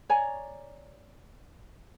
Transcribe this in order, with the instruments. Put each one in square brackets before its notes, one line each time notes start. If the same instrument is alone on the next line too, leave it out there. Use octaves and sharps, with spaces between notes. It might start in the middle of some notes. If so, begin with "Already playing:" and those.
[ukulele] C#5 D5 G#5 A#5